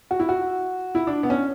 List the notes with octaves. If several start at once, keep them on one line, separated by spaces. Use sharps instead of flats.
F#4
E4
F#4
E4
D4
B3
C#4